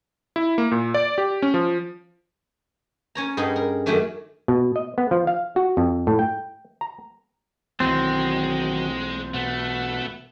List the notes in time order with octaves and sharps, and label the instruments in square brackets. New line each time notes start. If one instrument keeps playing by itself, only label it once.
[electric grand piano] E4
A#3
A#2
D5
G4
C#4
F3
[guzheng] C#4 C#5 A#5
G2 D#4 G#4 B4 D#5 F#5
A#4
F#2 D#3 F#3 A3 C#4 D4
[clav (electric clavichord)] B2
D#5
B3
F3
F5
F#4
F2
A2
G5
A#5
[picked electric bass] B1 E3 [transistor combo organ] D#3 F#3 [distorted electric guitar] G#3 [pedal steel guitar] C4
[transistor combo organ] B2 F#5 [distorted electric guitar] A3